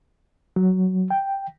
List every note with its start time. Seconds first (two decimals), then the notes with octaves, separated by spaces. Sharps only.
0.56 F#3
1.10 G5